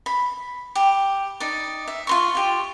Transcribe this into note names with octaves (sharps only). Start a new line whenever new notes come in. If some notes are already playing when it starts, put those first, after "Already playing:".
B5
G4
D#4 D5
E5
F4 C6 C#6
F4 G4